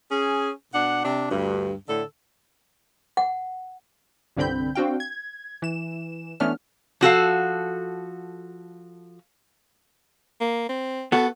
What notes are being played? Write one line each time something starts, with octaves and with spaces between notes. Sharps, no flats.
C#4 G#4
B2 D4 F#5
C3 D4
D2 G2
A2 D3 A4
F#5
C2 G2 D3 C4 B5 G6
C4 D4 F#4 F5 G5
G#6
E3 E7
E3 A3 B3 C#4 D4 F6
F3 F#4 A4 F5
A#3
C4
B3 F#4 A4